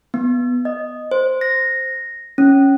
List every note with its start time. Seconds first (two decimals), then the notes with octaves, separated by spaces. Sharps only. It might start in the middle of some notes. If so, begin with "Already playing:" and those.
0.14 B3
0.65 D#5
1.11 C5
1.41 A#6
2.38 C#4